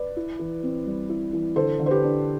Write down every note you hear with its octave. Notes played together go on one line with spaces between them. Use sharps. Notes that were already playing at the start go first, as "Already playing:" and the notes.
Already playing: B4 D5
E4
E3
C4
G3
E4
E3
D3 A4 C5
D3
C5
G4 B4
D4